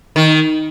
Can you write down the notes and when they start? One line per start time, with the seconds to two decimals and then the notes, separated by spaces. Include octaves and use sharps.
0.16 D#3